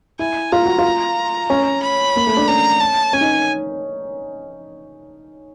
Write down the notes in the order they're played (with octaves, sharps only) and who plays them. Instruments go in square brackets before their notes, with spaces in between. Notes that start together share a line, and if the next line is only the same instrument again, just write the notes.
[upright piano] E4 [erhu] G#5
[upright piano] F4 [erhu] A#5
[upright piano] F#4
F4
C#4
[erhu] B5
[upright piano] A#3
A3
D4
[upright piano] C#4 [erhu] A#5
[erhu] A5
[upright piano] C#4 [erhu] G#5
[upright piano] D#4